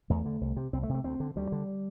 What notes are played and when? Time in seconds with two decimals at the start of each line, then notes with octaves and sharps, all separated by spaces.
0.10 E2 A3
0.26 D3
0.41 C2
0.56 C3
0.73 C2 C4
0.83 A3
0.89 C3
0.94 A3
1.04 D2 C4
1.20 D3
1.36 D2 G3
1.52 D3